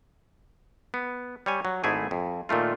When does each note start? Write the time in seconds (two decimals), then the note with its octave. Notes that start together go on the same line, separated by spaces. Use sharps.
0.94 B3
1.46 G3 C#5 G#5
1.65 F#3
1.84 G#1 G#2 A3 E4 G#4 G#5
2.11 F2
2.49 A#2 D#3 A3 F4